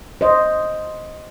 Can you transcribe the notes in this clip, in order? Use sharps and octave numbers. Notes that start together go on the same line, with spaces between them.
C5 D#5